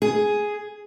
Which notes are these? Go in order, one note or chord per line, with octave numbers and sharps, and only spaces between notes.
G#4